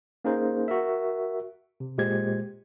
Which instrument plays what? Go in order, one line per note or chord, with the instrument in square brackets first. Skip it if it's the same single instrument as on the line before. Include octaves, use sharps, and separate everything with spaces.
[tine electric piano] A#3 C#4 D#4 G#4 A#4 C5
F#4 A#4 E5
C3
A#2 G#3 G4 C5 G#6